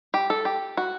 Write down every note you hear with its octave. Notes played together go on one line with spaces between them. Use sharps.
G4
A4
G4
F#4